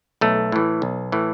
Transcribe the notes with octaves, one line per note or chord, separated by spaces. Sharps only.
B1 A3
A2 E3
B1
A2 E3